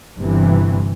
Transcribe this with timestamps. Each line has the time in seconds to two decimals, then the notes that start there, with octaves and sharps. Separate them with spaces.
0.18 G1 G2 C3 E3